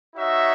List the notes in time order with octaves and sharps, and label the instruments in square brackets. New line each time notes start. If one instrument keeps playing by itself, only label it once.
[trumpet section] D#4 F#4 C#5 E5